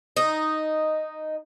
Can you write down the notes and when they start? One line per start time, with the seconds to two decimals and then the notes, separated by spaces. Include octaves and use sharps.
0.16 D#4